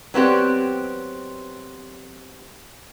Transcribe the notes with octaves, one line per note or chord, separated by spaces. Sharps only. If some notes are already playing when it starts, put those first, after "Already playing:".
F#3 B3 C4 G4 D5